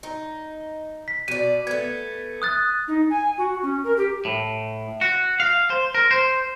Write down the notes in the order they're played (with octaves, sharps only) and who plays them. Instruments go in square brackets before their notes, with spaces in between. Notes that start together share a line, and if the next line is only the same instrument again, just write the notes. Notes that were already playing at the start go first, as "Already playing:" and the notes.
[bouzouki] D#4
[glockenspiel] B6
[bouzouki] B2 D5 [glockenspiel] D#7
[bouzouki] A3 B3 [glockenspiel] G#6
[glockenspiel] D#6 F#6 A6
[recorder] D#4
G#5
F#4
C#4
A#4
G4
[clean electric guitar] A2
F#4
F5
C5
A#4
C5